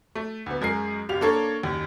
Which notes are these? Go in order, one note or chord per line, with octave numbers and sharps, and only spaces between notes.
A3
D2 B3
F#2 G#3 G#4 A#4 C7
F#1 G4 F5 F7
A#3 D4 A4 C#5
F#1 D#2